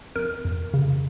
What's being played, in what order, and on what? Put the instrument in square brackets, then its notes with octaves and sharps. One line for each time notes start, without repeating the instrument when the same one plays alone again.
[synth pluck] F2 A#4
F2
C#3